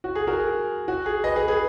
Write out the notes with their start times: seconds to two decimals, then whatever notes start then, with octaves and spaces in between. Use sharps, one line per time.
0.04 F#4
0.15 G#4
0.27 F#4 A#4
0.40 G#4
0.88 F#4
1.06 G#4
1.24 B4 D#5
1.36 G#4 B4
1.48 G#4 B4